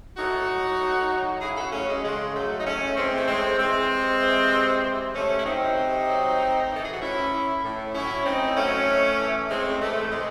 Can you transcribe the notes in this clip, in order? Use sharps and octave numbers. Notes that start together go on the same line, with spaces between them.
A2 D#4 F#4
F#3
A2
F#3
C#3 E4 G#4
G#4
F#4 A4
F#3 A3 C#4
G#3
C#3 G#3
F#3 A3
D#4
A2 A3 C#4
E3 G#3 C4
A3
A2 G#3 C4
E3 G#3 C4
C3
E3
C3
E3
C3 A3 C#4
E4
F#3 C4 D#4
C3
F#3
A2
E3
A4
G#4
F#4
A2 C#4 E4
E3
A2
F#3 C#4 E4
A2 C4 D#4
F#3 A3 C#4
A2
E3
A2 G#3 C4
E3 A3
C3 G#3